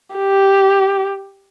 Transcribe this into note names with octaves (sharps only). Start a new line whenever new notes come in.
G4